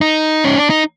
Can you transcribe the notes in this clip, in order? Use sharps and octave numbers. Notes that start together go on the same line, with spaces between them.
D#4
C#4
D4
D#4